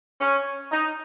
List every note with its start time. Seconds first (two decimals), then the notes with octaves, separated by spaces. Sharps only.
0.20 C#4
0.72 D#4